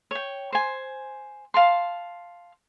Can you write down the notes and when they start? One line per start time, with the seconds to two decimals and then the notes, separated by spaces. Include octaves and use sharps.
0.11 C#5 G5
0.52 C5 G#5
1.54 F5 A5 C6